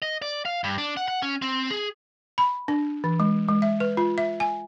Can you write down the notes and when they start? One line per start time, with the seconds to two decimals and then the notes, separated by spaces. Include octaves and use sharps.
0.02 D#5
0.22 D5
0.45 F5
0.64 G2
0.78 D4
0.97 F#5
1.08 F#5
1.22 C#4
1.42 C4
1.71 G#4
2.38 B5
2.68 D4
3.04 E3
3.20 G#3
3.48 G#3
3.62 E5
3.80 B4
3.97 F4
4.18 E5
4.40 G#5